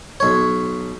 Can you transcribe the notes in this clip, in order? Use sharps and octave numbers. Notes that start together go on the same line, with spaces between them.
B1 C#5